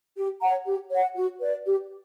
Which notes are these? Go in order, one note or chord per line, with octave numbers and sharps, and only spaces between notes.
G4
C#5 F#5 A#5
G4
C#5 F#5
F#4
B4 D5
G4